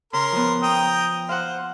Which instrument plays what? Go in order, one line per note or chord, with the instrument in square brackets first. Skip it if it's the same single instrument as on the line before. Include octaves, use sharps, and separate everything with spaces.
[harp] C#3 [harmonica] A#4 C6
[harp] F3 B3
[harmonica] G5 A#5 D#6
[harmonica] C5 [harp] F5 F#5